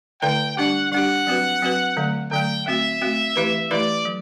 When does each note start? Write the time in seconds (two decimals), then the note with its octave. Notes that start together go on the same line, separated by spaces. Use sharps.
0.22 D3 A3 E4 B4 D5 G5
0.57 G3 D4 G4 F#5
0.92 G3 D4 G4 F#5
1.27 F#3 C4 F#4 B4
1.62 F#3 C4 F#4 B4
1.97 D3 F#3 A3
2.32 D3 F#3 A3 G5
2.66 A3 C4 F#4 E5
3.02 A3 C4 F#4
3.36 E3 A3 E4 G4 B4
3.71 E3 A3 E4 G4 B4 D5
4.05 F#3